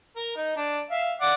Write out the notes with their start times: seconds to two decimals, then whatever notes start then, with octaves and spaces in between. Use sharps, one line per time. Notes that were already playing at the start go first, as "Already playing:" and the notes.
0.16 A#4
0.36 D#4
0.56 D4
0.91 E5 F5
1.21 D5 F#5 D6